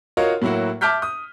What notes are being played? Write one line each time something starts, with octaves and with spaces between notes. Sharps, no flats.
F4 F#4 A#4 C#5 D#5 F5
A2 F#3 A#3 E4 F#4
E5 A5 D6 F6 G6 B6
D#6